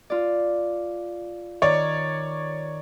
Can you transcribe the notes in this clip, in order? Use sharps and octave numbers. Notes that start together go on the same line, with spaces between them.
F4 D5
D#3 C#5 D5